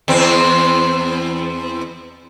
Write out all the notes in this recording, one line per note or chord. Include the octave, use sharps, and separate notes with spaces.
E2 C4